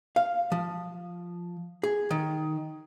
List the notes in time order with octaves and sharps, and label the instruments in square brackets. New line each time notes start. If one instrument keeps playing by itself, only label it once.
[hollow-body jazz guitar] F5
F3
G#4
D#3